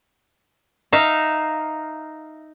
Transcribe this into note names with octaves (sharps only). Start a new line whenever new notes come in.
D#4 E5 F5